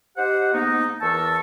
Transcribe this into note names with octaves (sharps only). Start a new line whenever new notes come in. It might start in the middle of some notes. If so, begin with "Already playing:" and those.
D#4 G4 C5 F#5
G#2 A#3 B3 D#4
E2 E3 A#4 A5 C#6 E6